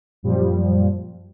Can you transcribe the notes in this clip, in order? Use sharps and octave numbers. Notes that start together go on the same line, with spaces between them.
F#2 A#2 F3 G3